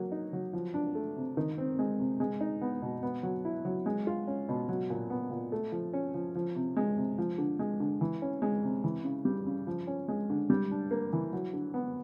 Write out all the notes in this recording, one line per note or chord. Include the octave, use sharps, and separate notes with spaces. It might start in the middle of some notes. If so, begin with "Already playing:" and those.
Already playing: F#3 A#3
D#4
F#3
F3
D4
A3
C3
D#3
C4
G#3
C3
G#3
D#4
B3
B2
B3
F#3
E4
F#3
G#3
F4
C#4
B2
F#3
A#2
B3
A#2
A3
F3
C#4
F3
F3
C3
G#3
C3
F3
D3
G#3
D3
E3
C#4
G#3
C3
E3
C#3
G3
C#3
F3
C#4
G#3
D3
G3
D4
A#3
E3
F#3
D3
B3